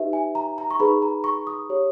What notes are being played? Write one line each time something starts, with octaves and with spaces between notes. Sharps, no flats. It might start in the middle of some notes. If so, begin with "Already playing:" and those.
Already playing: D#4 G4 B4 E5
G#5
A#5
A#5
C#6
D#4 G#4 B4 B5
A#5
C#6
D#6
G4 C#5